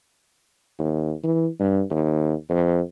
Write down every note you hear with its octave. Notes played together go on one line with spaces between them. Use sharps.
D#2
E3
G2
D#2
F2